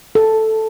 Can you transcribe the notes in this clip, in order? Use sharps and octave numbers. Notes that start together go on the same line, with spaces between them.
A4